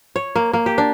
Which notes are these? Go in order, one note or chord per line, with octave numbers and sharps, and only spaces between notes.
C#5
A#3
A#3
G4
D4